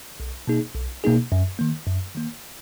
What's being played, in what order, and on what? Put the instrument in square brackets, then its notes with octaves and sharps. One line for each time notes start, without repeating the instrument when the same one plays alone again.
[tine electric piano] B1
B2 A#3 D#4 G#4
B1
B2 A#3 D#4 G#4
F#2
D#3 A#3
F#2
D#3 A#3